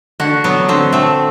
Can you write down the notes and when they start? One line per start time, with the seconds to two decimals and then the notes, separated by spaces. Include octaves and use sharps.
0.20 D3 F#4
0.44 F#3 B3
0.69 D3 C4
0.93 A3 C4